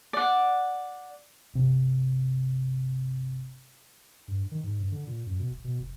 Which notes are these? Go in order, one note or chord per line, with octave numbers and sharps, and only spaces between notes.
D5 F#5
G1 C3
G2
D#3
G#2
G2
D3
A#2
F#2
B2
D#1
B2
F1